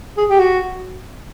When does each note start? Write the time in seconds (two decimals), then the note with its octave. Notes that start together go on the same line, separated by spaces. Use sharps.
0.18 G#4
0.29 G4
0.40 F#4